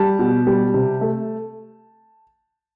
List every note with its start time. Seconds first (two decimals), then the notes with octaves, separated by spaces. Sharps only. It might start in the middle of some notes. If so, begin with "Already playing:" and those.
Already playing: G3 A5
0.19 B2
0.47 G3
0.74 C3
1.01 A3